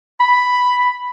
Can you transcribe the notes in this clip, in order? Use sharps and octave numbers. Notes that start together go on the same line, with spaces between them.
B5